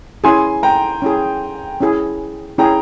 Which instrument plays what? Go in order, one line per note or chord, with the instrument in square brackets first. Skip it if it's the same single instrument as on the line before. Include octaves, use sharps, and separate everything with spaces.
[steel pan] C#4 E4 G#4 [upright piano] G#5 C6
[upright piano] G5 A#5
[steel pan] C#4 E4 G#4
C#4 E4 G#4
[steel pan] C#4 E4 G#4 [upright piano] G5 A#5